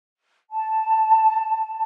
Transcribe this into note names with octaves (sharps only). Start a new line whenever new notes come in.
A5